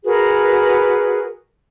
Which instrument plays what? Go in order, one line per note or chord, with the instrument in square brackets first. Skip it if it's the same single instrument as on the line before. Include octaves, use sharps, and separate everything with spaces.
[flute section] F#4 G#4 A#4 B4